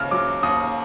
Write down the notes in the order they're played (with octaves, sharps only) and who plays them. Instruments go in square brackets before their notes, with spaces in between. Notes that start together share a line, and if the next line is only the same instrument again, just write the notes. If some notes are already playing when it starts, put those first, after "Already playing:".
Already playing: [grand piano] D#2 C#3 F6
F#3 D6
D#2 D#6